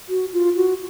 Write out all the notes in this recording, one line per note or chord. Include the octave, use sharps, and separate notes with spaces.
F#4
F4
F#4